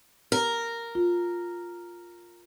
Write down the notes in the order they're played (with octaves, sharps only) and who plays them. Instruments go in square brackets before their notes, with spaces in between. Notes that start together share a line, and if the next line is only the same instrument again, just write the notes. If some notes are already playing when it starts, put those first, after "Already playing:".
[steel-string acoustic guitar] A#4
[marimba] F4